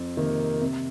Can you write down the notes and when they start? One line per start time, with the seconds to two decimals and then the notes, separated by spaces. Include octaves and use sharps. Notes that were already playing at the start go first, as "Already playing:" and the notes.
Already playing: F2
0.17 C3 D#3 A#3
0.61 C3